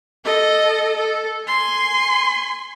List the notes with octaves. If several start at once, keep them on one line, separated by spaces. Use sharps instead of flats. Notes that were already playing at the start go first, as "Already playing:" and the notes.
A4 D#5
A4
G#5 C6